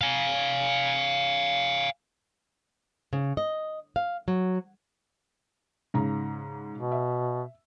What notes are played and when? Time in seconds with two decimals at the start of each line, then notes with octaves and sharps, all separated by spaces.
0.01 F5 G#5
3.13 C#3
3.37 D#5
3.96 F5
4.28 F#3
5.94 G#2 C#3 A#5
6.74 B2
6.92 E5